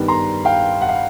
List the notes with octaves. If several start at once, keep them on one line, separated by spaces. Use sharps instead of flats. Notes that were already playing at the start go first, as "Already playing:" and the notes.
Already playing: G2 D#3 G3 B3
A#5 C6
F5 G5
F#5
F5